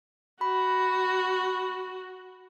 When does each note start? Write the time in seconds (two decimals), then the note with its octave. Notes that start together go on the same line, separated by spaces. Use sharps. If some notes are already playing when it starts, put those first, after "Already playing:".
0.41 F#4 B5